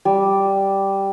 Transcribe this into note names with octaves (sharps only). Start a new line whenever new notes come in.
G3